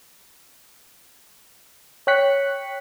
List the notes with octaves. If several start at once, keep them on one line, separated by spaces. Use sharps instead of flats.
C#5 G5 F#6 B6 C#7